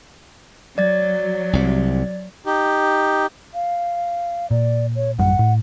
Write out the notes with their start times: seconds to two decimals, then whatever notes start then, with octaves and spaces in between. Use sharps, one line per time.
0.78 F#3 D5 A6
1.53 C2 C3
2.46 D#4 G4
3.54 F5
4.51 A#2 D5
4.96 C#5
5.19 A1 F#2 G3 F#5
5.39 A2